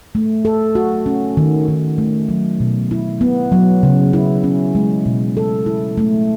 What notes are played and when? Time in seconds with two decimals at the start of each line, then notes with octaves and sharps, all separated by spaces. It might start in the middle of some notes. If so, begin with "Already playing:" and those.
0.15 A3
0.45 A4
0.75 F#4
1.06 C#4
1.37 D#3
1.68 D#3
1.98 A3
2.29 F#3
2.60 B2
2.91 E4
3.21 B3
3.52 F#3
3.83 C#3
4.13 E4
4.44 C#4
4.75 G#3
5.06 B2
5.37 A4
5.66 E4
5.98 A3